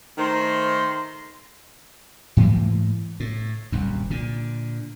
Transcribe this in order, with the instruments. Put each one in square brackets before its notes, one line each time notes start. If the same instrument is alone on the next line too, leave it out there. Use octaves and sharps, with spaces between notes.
[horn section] D#3 A3 C5 A#5 C6
[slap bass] G#2 E3 A3 A#3
A2
D#1 C2 F#2
A#2 D3